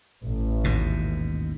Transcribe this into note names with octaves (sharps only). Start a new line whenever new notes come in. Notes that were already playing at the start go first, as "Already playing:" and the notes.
A1
D#2 G#2 B2